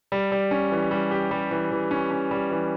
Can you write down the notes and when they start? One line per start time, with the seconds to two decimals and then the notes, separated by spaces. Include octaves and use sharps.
0.12 G3
0.32 G3
0.51 C#4
0.71 E3
0.91 G3
1.11 G4
1.31 G3
1.51 E3
1.71 E3
1.91 C#4
2.11 C#4
2.31 G3
2.50 E3